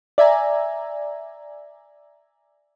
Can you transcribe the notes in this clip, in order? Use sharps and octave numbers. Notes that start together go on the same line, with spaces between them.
D5 E5 G#5 A#5